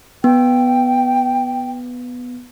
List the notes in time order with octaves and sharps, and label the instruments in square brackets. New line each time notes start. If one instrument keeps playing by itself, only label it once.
[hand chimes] B3 [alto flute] G5